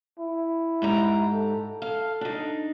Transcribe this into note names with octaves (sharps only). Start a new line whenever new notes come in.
E4
G#2 G4 A#5
A4
A4 F5
D4 D#4